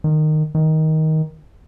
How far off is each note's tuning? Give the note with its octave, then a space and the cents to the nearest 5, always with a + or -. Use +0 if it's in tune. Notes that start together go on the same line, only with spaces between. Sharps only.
D#3 -15
D#3 +15